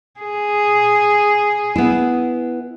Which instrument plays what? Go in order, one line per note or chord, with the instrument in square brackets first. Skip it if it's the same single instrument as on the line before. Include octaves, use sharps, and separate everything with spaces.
[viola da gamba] G#4
[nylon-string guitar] B3 E4